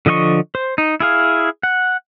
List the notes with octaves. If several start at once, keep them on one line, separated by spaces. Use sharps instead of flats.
D3 F3 D#5 F5 C#6
C5
D#4
E4 G#4 F5
F#5